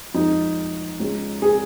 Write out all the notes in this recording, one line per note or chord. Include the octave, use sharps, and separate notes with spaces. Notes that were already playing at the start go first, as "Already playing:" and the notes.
F2 F3 G#3 D#4
C#2 C#3 G#3
G#4